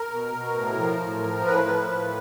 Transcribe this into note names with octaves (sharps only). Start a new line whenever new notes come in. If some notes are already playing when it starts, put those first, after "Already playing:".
Already playing: A#4
B2
B2
A2
F3
A2
F3
A2 B4
F3
A2